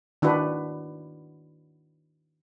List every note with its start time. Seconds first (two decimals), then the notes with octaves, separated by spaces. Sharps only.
0.22 D#3 D4 E4 F#4 B4